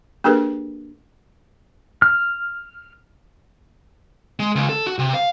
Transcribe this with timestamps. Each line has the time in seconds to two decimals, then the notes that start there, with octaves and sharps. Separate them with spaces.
0.24 A#3 D4 G4 G#4 A#4 B4
2.02 F6
4.40 G#3
4.55 C#2
4.69 A4
4.87 F#4
4.99 C3
5.14 F5